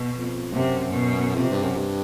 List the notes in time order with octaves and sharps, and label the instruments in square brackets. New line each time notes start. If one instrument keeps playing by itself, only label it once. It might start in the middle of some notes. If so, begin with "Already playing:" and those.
Already playing: [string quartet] B2
[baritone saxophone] F2
[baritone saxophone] F#2 [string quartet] C3
[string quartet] B2
[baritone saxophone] F2 [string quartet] C3
[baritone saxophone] G2
F#2
G2